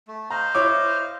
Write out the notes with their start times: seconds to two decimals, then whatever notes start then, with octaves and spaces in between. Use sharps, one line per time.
0.08 A3
0.30 C5 D#5 F5 A#5
0.55 E4 C#5 D6